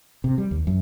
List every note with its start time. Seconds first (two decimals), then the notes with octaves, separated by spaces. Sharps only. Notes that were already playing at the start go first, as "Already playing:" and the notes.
0.24 C3
0.38 G3
0.51 D#2
0.67 F#2